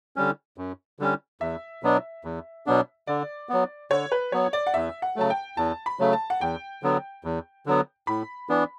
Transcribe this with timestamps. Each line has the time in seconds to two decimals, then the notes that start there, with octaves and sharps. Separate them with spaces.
0.16 D3 G3 C#4
0.58 F#2
0.99 D3 G3 C#4
1.41 E2 E5
1.83 B2 F#3 B3 D4
2.25 E2
2.66 B2 F#3 B3 D4
3.07 D3 D5
3.49 F#3 B3
3.91 D3 C#5
4.12 B4
4.32 F#3 B3 C#5
4.53 D5
4.67 F#5
4.74 E2 E5
5.02 F#5
5.16 C#3 F#3 A3 A5
5.30 G5
5.57 E2 A5
5.86 B5
5.99 C#3 F#3 A3
6.13 A5
6.30 F#5
6.41 E2 G5
6.83 D3 F#3 B3
7.24 E2
7.66 D3 F#3 B3
8.07 A2 B5
8.49 E3 B3 D4